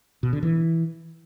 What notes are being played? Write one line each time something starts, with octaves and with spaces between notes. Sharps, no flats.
B2
D3
E3